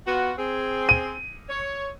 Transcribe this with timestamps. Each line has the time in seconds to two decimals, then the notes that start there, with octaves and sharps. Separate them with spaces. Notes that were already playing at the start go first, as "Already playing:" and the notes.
0.06 B3 F4 F#4
0.38 C4 G#4
0.89 D#7
1.49 C#5